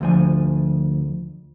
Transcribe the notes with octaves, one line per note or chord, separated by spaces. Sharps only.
D2 F3 G#5